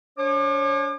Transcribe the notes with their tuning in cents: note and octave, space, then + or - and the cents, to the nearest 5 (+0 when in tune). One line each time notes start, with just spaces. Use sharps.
D4 -45 C#5 -30 D6 +40